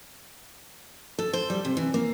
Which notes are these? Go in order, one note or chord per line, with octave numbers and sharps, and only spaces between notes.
A4
C5
G3
C3
E3
A#3